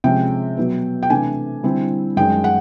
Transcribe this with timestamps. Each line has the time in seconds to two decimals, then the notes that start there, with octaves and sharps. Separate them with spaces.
0.04 C3 F3 G#3 C#4 G5
0.57 B2 F#3 B3
1.03 G5
1.10 C3 E3 A3 D4 G#5
1.64 D3 G3 C4 E4
2.17 F#2 D#3 G#3 C#4 G5
2.44 F#5